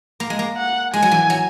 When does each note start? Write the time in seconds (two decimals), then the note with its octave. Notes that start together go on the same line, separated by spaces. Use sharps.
0.20 A#3
0.30 G#3
0.39 A#3
0.57 F#5
0.93 G#3 G#5
1.02 F#3
1.11 E3
1.30 F#3